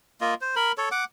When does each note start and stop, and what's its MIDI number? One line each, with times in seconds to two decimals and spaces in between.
0.21 0.34 58
0.21 0.34 65
0.21 0.34 75
0.41 0.55 72
0.56 0.72 70
0.56 0.72 83
0.78 0.89 69
0.78 0.89 73
0.91 1.04 78
0.91 1.04 86